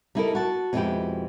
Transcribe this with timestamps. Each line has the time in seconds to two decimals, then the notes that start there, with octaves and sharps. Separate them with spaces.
0.15 G3 D#4 E4 G4 A4 A#4
0.35 F#4 A5
0.73 F2 B2 G#3 D#4 E4 G4